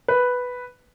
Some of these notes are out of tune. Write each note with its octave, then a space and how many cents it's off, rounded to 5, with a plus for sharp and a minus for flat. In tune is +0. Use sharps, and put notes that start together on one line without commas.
B4 +0